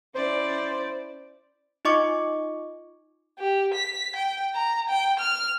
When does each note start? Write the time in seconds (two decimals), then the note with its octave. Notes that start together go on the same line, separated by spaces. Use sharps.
0.15 C#4 E4 C5 D5
1.85 D#4 F4 D#5 C#6 D6 C#7
3.39 G4
3.74 B6
4.15 G5
4.55 A#5
4.89 G5
5.19 F6